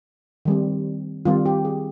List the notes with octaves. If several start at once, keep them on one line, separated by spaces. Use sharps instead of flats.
D#3 G3 C4
D#3 G3 C4 F4
G4
G#4